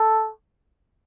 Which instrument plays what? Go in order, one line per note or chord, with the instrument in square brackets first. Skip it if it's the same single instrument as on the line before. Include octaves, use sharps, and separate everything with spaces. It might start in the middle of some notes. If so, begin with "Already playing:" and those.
Already playing: [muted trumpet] A4